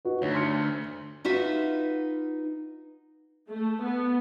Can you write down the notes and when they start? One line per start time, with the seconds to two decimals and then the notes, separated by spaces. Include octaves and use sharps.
0.05 D#4 F#4 B4
0.22 D2 C#5
0.35 C6 F6 C#7
1.25 D#4 F4 F#4 B4 E5
3.49 A3
3.82 B3